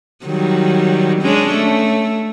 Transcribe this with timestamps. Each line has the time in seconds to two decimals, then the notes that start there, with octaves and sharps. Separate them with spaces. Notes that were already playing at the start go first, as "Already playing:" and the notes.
0.24 D#3 F#3 G3
1.22 G#3 C#4 D4
1.54 A3